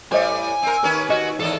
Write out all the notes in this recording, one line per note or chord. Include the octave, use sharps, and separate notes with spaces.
A2 G3 C5 C#5 D#5 G#5
C4 A#4
D#2 C#4 A#4 B4
F#4 D#5
E2 G#2 D#3 A4